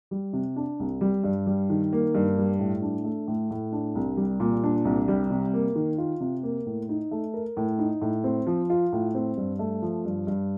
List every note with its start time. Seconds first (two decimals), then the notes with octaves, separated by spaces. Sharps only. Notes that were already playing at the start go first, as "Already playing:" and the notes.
0.11 G3
0.33 C3
0.56 D4
0.80 C2
1.01 G3
1.24 G2
1.46 G3
1.70 D#3
1.93 A#3
2.15 G2
2.38 G3
2.59 A2
2.82 D4
3.04 A3
3.28 A2
3.51 A2
3.72 D4
3.95 C2
4.17 G3
4.40 A#2
4.64 D4
4.85 C2
5.08 G3
5.31 C3
5.54 A#3
5.75 D#3
5.98 F4
6.20 C3
6.43 A#3
6.66 A2
6.89 D#4
7.11 A3
7.34 A#4
7.57 A2
7.79 D#4
8.02 A2
8.24 C4
8.47 F3
8.70 F4
8.93 A2
9.15 C4
9.37 G2
9.59 A3
9.82 F3
10.05 G2
10.27 G2